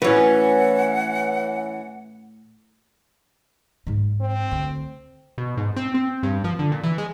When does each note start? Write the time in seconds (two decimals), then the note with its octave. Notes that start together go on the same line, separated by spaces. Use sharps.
0.02 A2 E3 C#4 F#4 B4 F#5
3.87 G#2 G#3
4.21 C4
4.51 D2
5.38 B2
5.57 G#2
5.76 C4
5.94 C4
6.23 G2
6.44 F3
6.59 D3
6.72 A#2
6.83 E3
6.98 G#3